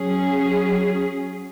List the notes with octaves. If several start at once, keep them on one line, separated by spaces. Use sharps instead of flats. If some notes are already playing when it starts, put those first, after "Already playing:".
Already playing: F#3 C#4 G#4